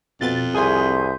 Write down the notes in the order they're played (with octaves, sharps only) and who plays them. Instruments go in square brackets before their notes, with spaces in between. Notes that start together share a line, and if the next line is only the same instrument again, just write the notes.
[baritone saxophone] F2 [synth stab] B2 A6
[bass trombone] C2 [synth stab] G#4 G#5 D#6 [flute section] E5 C6 G6